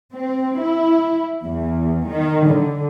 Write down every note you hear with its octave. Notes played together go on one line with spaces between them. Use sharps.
C4
E4
E2
D#3
D3